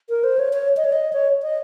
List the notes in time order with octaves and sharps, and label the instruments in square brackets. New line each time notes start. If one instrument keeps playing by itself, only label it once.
[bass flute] A#4
C5
C#5
C#5
D#5
C#5
D#5
C#5
D#5